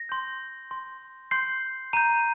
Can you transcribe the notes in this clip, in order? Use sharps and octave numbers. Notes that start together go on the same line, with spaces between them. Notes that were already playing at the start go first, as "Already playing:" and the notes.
Already playing: A#6
C6 G6
C6 G6
C6 G6 C7
A#5 G6 D#7